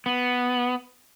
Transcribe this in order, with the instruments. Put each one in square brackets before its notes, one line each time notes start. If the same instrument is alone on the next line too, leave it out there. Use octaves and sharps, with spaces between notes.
[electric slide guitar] B3